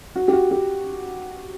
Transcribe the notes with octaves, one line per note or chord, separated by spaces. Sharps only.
F#4
G4
F#4
G4